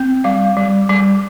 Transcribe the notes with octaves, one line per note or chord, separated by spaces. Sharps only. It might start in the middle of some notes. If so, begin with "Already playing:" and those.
Already playing: C4
G3 F5
G3
G3